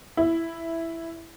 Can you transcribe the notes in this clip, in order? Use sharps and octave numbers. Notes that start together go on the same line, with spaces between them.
E4